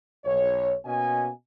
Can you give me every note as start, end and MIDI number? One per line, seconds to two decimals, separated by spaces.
0.25 0.75 35
0.25 0.75 73
0.85 1.30 47
0.85 1.30 58
0.85 1.30 61
0.85 1.30 66
0.85 1.30 75
0.85 1.30 80